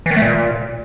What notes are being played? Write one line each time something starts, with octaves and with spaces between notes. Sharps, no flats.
E3
D#3
A3
A#2